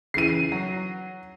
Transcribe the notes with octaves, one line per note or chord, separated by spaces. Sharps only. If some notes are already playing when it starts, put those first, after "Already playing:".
C#3 E3 C7 D#7
F#3